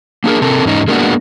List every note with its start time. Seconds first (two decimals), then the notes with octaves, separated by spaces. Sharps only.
0.24 A#3 D4 G#4 A#4
0.42 C3 C4 A4 A#4
0.64 E2 G#2 C#4 D#4
0.88 G#3 A#3 B3 D4 E4 F#4